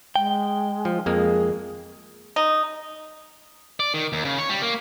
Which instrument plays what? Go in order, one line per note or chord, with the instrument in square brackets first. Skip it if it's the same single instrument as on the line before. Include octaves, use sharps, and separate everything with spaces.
[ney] G#3 [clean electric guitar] G5
[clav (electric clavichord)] F3
[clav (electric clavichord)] F2 G#3 A#3 [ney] G#4
[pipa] D#4
[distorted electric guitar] D5
D#3
D#2
C#3
C#5
G3
A#3